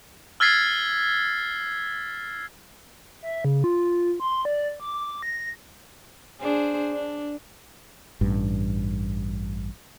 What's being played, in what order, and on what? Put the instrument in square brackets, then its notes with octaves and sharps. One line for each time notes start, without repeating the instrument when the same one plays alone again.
[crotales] E6 F6 G#6 A6 B6 C7
[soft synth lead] E5
C#3
F4
C6
D5
D6
A#6
[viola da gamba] D4 G#4 C5
D4
[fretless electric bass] A1 G2